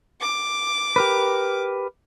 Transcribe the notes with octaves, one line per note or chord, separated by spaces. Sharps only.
D6
G4 A#4 B4